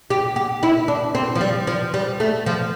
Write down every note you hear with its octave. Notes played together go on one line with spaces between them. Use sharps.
G4
G4
E4
D4
C4
F3
G3
F3
G3
A3
F3